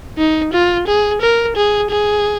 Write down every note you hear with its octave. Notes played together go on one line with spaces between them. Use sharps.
D#4
F4
G#4
A#4
G#4
G#4